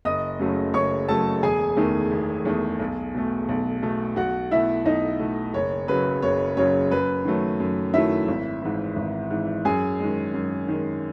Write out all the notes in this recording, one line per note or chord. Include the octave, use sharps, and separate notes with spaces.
F#1 D#5 D#6
F#2 C#3 F#3 A3
F#1 C#5 C#6
F#2 C#3 F#3 A3 A4 A5
E1 G#4 G#5
E2 D#3 A3
E1
E2 D#3 A3
B1
B2 A3
B1
B2 A3
B1 F#4 F#5
B2 A3 E4 E5
B1 D#4 D#5
B2 A3
F#1 C#5
F#2 C#3 F#3 B4
F#1 C#5
F#2 C#3 F#3 C#5
F#2 B4
D#3 F#3 A3
F#2
D#3 F#3 A3 E4 E5
G#1
G#2 E3
G#1
G#2 E3
F#2 G#4 G#5
D#3 G#3
F#2
D#3 G#3